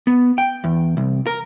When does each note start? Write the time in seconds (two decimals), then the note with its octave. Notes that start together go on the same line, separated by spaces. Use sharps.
0.07 B3
0.38 G5
0.64 E2
0.97 C2
1.27 A#4